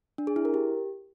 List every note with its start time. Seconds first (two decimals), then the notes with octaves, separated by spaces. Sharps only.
0.18 D4
0.27 G#4
0.36 E4
0.45 A#4
0.54 G4